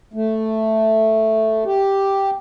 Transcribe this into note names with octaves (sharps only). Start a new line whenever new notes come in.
A3
G4